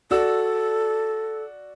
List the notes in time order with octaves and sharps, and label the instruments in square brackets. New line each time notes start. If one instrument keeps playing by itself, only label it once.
[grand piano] F#4 D5 E6 [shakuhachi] A4